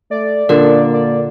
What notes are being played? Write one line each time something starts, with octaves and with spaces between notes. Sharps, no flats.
A3 D5
A#2 D3 A#3 A4 A#4
D5